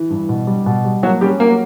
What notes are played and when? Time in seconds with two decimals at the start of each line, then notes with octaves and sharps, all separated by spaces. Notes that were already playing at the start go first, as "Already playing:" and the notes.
Already playing: E3
0.10 G2
0.29 B2
0.47 G3
0.66 B2
0.85 G3
1.03 F#3 A#3 F#4
1.21 G3 C#4 G4
1.40 F#3 A#3 A#4